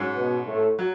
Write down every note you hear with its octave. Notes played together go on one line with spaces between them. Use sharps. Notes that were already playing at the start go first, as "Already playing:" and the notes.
Already playing: G#2 F#3 C#4
B2 B3
A2 A3
F#3